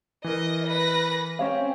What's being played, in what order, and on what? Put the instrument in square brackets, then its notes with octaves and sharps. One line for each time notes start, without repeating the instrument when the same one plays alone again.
[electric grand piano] E3 A#4 [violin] D#5 A#6
[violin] B4 A#6
[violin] C4 [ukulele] C#4 C#5 F5